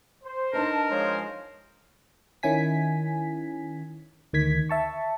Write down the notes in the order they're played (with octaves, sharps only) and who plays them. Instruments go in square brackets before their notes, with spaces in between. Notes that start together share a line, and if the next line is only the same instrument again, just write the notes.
[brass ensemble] C5
[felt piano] D4 D#4 B4 [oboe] A#4 [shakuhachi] A5
[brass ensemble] F3 G#3 C5 [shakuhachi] C#5
[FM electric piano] D#3 C#4 E4 G#5 B6
D2 D#3 G#6 B6
E5 A5 C#6